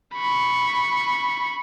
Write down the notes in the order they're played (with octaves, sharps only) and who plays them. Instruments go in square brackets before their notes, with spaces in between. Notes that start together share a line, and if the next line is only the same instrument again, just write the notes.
[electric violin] B5 C#6